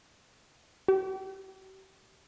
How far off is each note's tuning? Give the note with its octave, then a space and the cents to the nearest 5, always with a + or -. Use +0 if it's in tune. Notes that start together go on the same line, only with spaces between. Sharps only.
G4 -35